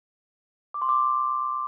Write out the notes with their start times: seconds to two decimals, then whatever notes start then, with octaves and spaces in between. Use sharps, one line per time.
0.74 D6
0.82 C6
0.89 D6